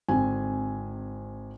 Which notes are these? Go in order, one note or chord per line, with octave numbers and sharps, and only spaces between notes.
G#1 D3 C4 G#5